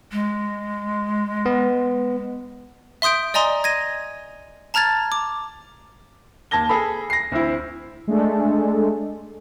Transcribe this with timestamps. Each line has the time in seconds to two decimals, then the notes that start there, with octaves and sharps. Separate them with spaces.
0.12 G#3
1.46 B3
3.02 E5 C6 D#6 G6 D7
3.34 D5 D#5 G#5 A#5 C6 D#6
3.64 G#6 A#6 D#7
4.74 A5 A#5 F6 G#6 A6
5.12 D6
6.51 D#2 A5 G#6 A#6 G7
6.69 G#4 A4 B5
7.10 A#6 C7
7.32 D2 C4 E4
8.08 G#3 A3 D4 A4